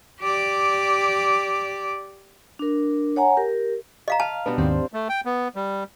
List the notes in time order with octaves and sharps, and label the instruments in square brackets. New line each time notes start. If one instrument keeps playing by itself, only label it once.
[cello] G4 D5
[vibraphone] D4 A#4
C#5 F#5 G#5 A#5
G4 A#4
[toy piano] D#5 F5 A#5
[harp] F5 [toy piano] A5
[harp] B2 G3 D4 [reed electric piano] B4
[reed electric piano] D#2 G#2 D#3 [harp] C4 C5
[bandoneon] A3
G5
B3
G3